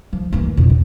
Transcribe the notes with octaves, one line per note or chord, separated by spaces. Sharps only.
F3
E3 A#3
F2 B2
D2